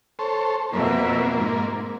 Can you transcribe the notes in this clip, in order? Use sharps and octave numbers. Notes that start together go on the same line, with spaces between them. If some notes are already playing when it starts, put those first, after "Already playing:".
A4 C5 C#5
F2 B2 A#3 E5
G#2